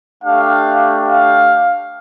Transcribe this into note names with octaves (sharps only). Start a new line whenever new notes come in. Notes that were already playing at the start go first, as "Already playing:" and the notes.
A3 D4 G4 F5
F5